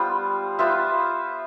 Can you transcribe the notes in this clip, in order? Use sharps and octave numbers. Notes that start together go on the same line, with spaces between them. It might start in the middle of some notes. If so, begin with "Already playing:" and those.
Already playing: G3 B3 F4 C5
B3 F4 C5 E5